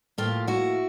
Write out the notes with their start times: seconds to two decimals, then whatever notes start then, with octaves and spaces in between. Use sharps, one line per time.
0.18 A2 F3 A#3 F4 G4
0.47 E4 F#4